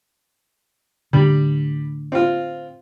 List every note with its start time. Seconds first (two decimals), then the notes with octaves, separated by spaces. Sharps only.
1.13 A2 D3 G3
2.12 C4 F4